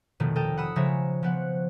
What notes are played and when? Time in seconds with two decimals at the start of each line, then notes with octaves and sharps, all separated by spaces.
0.20 F1 B2 D#3 A3
0.36 A4 A#4 D#5 G5
0.57 F#5 B5 D#6 E6
0.76 C#3 F3 G#3 C#5 E5 A#5
1.23 F3 B3 F#5